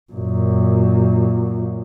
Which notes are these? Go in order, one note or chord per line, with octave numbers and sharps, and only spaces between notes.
F#2 A#2